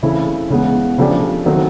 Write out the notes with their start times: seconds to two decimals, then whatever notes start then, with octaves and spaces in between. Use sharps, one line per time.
0.03 C#3 E3 A3 C4 E4
0.50 C#3 E3 G#3 B3
0.98 C#3 F3 A3 D4 G4
1.46 D#3 F#3 A3 C4